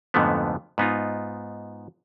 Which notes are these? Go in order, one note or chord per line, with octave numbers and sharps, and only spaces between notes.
F2 G#2 D3 F3 A3 B3
G#2 B3 D#4 F4